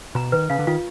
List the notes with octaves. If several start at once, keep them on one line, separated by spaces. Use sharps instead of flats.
B2 A#5
D#3 B4
C#3 F5
D3
D#3 F4